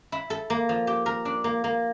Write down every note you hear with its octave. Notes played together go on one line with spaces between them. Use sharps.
E4
A4
A#3
F3
G4
A#4
D4
A#3
A#3